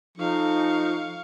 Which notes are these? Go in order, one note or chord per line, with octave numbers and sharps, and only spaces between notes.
F3 D#4 A4 F5 C#6